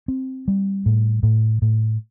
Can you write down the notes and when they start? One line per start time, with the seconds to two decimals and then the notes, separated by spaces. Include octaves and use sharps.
0.08 C4
0.48 G3
0.86 A2
1.23 A2
1.62 A2